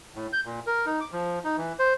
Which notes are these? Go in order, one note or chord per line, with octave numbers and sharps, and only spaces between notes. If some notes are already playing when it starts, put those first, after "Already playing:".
A2
G6
A#2
A#4
D#4
D6
F3
D#4
E3
C5